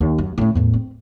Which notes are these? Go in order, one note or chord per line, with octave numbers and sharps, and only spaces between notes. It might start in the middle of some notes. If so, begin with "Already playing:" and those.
D#2
F#2
A2 C#4
E2 A2
C4